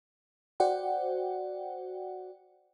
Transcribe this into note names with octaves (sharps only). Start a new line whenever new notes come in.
F#4 C5 D5 F#5 G5